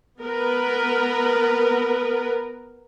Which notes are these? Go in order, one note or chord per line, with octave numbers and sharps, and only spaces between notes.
B3 A#4 B4